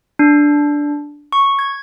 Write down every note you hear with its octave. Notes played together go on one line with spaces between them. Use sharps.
D4
C#6
G#6